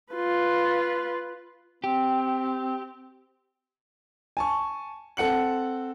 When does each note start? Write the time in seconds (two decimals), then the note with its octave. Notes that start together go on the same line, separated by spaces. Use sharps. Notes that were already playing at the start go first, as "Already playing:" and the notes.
0.13 F4 B4
1.84 C4 G4
4.37 G#5 A5 C#6
5.17 C4 A4 F#5 C#7 F#7